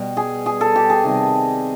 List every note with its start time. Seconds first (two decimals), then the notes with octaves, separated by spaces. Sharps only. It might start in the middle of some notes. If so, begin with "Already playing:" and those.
Already playing: B2 G3
0.17 G#4
0.46 G#4
0.61 A4
0.76 G4
0.90 G#4
1.04 C3 D#3 G3